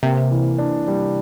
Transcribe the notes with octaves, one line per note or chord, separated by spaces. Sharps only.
C3 A#3
E3
D4
G3